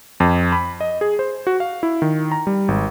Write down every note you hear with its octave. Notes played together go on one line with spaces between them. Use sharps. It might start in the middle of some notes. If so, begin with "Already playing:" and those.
F2
B5
D#5
G#4
C5
F#4
F5
E4
D#3
A#5
G3
G#1